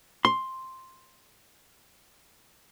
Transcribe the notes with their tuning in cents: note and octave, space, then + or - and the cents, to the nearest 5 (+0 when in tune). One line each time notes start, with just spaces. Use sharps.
C6 +5